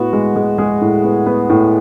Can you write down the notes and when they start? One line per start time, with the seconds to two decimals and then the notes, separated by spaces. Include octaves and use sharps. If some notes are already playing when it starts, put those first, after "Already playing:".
Already playing: A2 B3 F#4
0.13 G#3
0.36 G#3
0.58 G#3 G#4
0.81 A2
1.04 B3
1.26 B3
1.50 A2